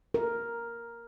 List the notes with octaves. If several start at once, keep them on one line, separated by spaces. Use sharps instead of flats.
A#4